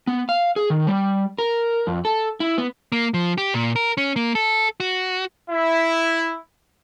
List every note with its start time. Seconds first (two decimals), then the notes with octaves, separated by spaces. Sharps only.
0.07 B3
0.29 F5
0.56 G#4
0.70 D#3
0.87 G3
1.38 A#4
1.87 F2
2.05 A4
2.40 E4
2.58 B3
2.92 A#3
3.14 F3
3.38 G4
3.54 A#2
3.76 A#4
3.97 C#4
4.16 A#3
4.35 A4
4.80 F#4
5.51 E4